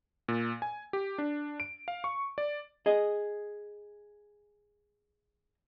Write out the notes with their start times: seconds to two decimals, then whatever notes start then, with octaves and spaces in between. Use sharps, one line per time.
0.28 A#2
0.62 G#5
0.93 G4
1.18 D4
1.60 D7
1.88 F5
2.04 C#6
2.38 D5
2.86 G#4 D#5